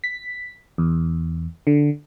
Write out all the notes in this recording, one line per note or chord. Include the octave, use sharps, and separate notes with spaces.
B6
E2
D3